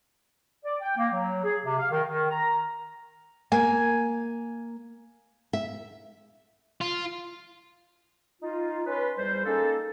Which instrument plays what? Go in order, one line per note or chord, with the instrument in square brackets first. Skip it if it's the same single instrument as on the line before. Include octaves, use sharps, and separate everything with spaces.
[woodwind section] D5
G5
A#3
F#3
G#4
C3
F5
D#3
D#3
A#5
[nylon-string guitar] A#3 [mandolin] G#5
[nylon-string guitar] E5
[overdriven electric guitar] F4
[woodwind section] D#4 F4
C#4 F4 B4
E2 G3 C5
G#3 A#3 C#4 D#4 A4